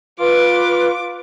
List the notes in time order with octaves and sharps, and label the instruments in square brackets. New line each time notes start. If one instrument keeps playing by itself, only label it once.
[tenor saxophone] F4 [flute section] B4 [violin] D6